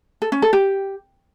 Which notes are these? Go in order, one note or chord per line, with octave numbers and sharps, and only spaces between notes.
A4
C#4
A4
G4